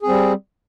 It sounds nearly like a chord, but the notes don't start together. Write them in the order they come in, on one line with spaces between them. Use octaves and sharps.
G#4 C4 G3